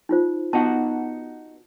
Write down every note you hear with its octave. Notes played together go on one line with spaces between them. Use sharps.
D#4 F4 C5
B3 D#4 F#4 F#5 A5